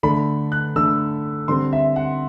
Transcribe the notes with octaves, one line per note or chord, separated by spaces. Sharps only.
D3 A3 D4 B5
F#6
D3 A3 D4 E6
D3 G3 C4 C6
E5
F#5